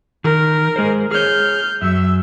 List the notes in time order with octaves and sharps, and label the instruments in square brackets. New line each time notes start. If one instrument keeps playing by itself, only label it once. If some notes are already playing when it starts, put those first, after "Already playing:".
[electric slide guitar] D#3 [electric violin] A#4
[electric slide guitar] G#3 G#4 C5
[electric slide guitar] G#4 C#5 [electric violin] F6 G6
[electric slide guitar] F#2 F#3 [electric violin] E5 E6